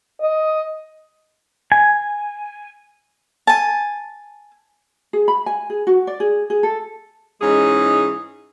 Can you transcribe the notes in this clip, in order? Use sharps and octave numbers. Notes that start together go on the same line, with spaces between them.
D#5
G#5
G#5 A5
G#4
B5
G#5
G#4
F#4
D5
G#4
G#4
A4
G#2 E3 G#3 C#4 D#4 G#4